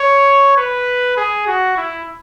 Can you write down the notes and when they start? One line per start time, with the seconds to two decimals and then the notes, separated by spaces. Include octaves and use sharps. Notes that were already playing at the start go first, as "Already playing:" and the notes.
Already playing: C#5
0.57 B4
1.17 G#4
1.47 F#4
1.77 E4